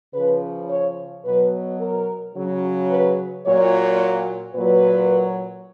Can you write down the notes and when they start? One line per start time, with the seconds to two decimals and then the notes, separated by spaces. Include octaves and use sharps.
0.14 C#3 F3 B4
0.70 C#5
1.25 B2 F#3 B4
1.81 A#4
2.35 C#3 F#3
2.90 B4
3.45 A#2 F#3 C#5
4.55 A#2 F#3 B4